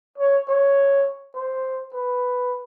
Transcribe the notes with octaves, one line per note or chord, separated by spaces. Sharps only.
C#5
C#5
C5
B4